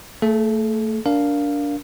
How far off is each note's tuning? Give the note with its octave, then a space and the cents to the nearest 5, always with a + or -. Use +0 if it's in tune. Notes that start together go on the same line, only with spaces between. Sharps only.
A3 +25 A4 -40
D4 -20 A#4 +0 F5 +0